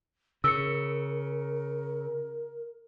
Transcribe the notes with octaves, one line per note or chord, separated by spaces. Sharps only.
C#3 A#4 E6 C#7